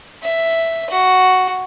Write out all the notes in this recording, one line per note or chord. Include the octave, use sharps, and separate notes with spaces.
E5
F#4